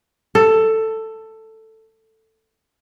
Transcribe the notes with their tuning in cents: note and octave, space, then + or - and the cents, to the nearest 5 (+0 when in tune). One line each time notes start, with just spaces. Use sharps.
A4 +10